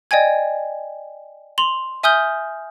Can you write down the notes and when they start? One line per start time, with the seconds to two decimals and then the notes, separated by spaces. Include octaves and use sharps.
0.11 D5 D#5 G5 G#5 G#6
1.58 C6 F7 F#7
2.03 E5 G#5 D#6 F6 G6 G7